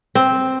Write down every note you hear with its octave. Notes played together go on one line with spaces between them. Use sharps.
C4